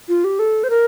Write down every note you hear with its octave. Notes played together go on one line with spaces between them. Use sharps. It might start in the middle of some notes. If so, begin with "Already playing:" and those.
F4
G4
A4
C5
A#4